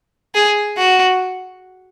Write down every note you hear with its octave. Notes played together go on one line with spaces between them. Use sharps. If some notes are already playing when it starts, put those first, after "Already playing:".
G#4
F#4